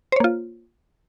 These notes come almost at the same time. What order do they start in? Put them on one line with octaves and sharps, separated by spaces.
C5 C#5 A#3 F4